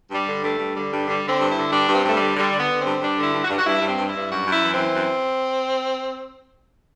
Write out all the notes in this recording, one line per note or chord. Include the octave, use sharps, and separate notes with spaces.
G2 G3
D3
G2 A3
G2
D3 G3
G2
D3 G3
D3
C4
G2
E4
D3
G2 D4
G2 C4
G2 A3
D3 G3
D3 G3
D3
B3
D3
C4
G2
G2 D4
D3
E4
G2
F#4
G2
F#4
G2 E4
G2
C4
G2
G2 E4
F#2 F#4
F#2
E4
E3
E3 C4
F#2